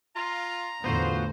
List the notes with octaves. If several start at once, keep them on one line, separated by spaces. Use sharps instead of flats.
F4 A#5
E2 A2 D3 B3 F4 F#4 C5